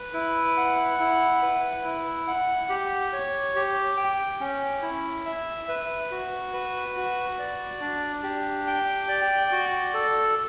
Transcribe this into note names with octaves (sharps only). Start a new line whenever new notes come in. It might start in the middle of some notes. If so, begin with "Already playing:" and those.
Already playing: B4
E4
F#5
E4
B4
E4
F#5
G4
C#5
G4
G5
C#4
E4
E5
B4
F#4
B4
F#4
D5
D4
G4
G5
D5
F#4
A4